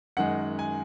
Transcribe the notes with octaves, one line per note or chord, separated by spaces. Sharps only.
F#2 D#3 G#3 F#5
G#5